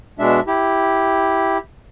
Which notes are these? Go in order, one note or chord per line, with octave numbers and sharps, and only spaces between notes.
B2 G#3 D4 E5
E4 G4